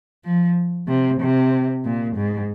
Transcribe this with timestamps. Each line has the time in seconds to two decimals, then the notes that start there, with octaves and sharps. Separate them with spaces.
0.25 F3
0.88 C3
1.20 C3
1.85 A#2
2.16 G#2